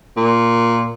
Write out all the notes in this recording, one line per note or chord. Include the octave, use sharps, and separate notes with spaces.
A#2